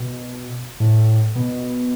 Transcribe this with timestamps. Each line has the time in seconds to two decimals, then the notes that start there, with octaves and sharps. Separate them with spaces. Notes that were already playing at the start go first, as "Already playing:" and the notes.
Already playing: B2
0.80 A2
1.36 B2